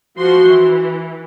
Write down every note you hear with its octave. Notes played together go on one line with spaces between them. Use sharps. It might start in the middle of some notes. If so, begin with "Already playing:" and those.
F3 F#4 C6
E3